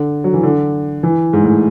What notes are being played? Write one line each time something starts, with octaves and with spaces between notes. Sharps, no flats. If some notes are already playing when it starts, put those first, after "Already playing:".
Already playing: D3
F#3
E3
D3
E3
G#2
A2